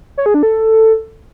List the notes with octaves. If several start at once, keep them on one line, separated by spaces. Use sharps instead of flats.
C#5
G#4
D4
A4